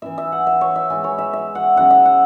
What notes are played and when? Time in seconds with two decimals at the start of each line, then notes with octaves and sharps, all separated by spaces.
0.02 E3 C#4 E4 E5
0.18 E5
0.32 F#5
0.47 E5
0.61 C#5
0.76 E5
0.90 E3 G#3 E4 G#5
1.04 C#5
1.18 E5
1.33 E5
1.55 F#5
1.76 C#3 F#3 C#4 E4 F#5
1.90 E5
2.05 F#5